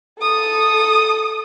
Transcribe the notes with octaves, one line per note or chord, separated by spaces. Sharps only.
A4 D#6